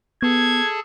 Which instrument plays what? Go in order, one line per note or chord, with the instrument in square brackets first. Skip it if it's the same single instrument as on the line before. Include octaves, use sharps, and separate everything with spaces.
[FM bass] B3 [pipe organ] G#4 A4 A5 [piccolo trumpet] G#6